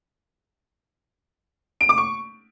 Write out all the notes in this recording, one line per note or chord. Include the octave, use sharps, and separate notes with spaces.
D7
D6
C#6